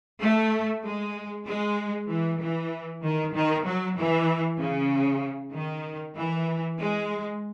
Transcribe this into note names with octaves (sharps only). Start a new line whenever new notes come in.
A3
G#3
G#3
E3
E3
D#3
D#3
F#3
E3
C#3
D#3
E3
G#3